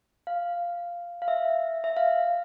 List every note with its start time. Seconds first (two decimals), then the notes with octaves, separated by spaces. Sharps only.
0.27 F5
1.22 F5
1.28 E5
1.84 E5
1.97 F5